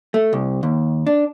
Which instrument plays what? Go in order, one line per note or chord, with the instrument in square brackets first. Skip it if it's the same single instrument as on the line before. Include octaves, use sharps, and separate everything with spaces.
[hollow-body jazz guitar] A3
C2
D#2
D4